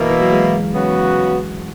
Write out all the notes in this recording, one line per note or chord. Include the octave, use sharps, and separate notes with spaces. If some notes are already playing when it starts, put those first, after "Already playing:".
Already playing: B2 E3 A#3 E4
E3
F#3
G#3
C#3 F#3 B3 F#4